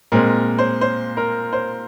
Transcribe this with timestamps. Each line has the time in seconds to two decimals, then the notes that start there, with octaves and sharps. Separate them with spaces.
0.12 A#2 G#3 C4 A#4
0.58 C5
0.81 C5
1.17 A#4
1.53 C5